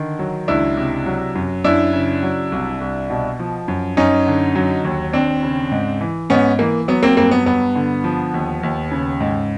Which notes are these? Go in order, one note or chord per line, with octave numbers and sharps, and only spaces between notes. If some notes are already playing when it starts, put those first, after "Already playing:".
Already playing: D3 D#3
F#3
C#2 D4 E4
C3
F#3
F#2
F#2 D4 E4
C#3
F#3
C2
C2
B2
F3
F#2
F#2 C#4 D#4
D3
F#3
D#2
D#2 C4 D4
C#3
G#2
E3
G#2 B3 C#4
E3 A#3
F#3 B3
A#3 C4
G2 A#3 C4
B3
G2 B3
D3
F3
D#2
D#2
C#3
G#2